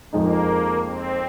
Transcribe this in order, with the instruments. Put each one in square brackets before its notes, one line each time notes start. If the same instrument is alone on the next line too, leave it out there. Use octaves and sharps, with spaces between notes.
[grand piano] F2 F3 G#3 D#4 [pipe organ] A#3
[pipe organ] C4